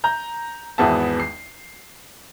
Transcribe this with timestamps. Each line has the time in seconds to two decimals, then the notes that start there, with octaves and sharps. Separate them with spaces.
0.04 A#5 G6
0.78 G#1 E2 B3 G#4 E5 A5
1.20 C7